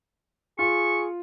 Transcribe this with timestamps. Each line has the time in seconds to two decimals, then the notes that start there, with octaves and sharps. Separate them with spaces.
0.59 F4 G#4 C#6